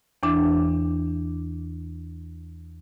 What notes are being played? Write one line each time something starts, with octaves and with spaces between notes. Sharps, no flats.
E2 E3 D4